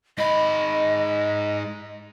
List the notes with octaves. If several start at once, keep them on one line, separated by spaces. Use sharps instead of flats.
G#2 D#5 B5